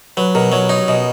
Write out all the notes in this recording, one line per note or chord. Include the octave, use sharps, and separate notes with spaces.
F#3 B4
B2 A#4
F#3 C#5
D#4 C#5
B2 D#5